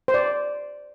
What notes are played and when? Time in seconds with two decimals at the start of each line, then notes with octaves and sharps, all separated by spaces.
0.08 C5
0.14 D5